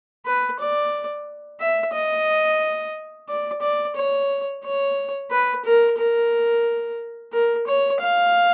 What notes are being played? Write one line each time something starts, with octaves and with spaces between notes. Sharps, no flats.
B4
D5
E5
D#5
D5
D5
C#5
C#5
B4
A#4
A#4
A#4
C#5
F5